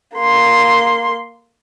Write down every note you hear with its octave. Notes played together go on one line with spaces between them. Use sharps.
A#3 C6